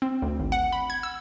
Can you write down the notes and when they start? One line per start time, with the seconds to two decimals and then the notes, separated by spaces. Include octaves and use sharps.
0.02 C4
0.22 D2
0.40 G#1
0.52 F#5
0.73 B5
0.90 G#6
1.03 E6